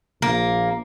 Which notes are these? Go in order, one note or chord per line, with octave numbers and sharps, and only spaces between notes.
A#1 A#3